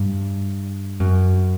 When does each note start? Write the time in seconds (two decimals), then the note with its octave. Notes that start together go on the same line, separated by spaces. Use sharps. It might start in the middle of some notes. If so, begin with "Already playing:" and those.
Already playing: G2
1.00 F#2